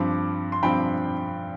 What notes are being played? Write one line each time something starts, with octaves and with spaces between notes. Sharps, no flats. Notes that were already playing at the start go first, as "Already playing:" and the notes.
Already playing: G2 F3 C4 B5 D6
C6
G2 F3 C4 G5 B5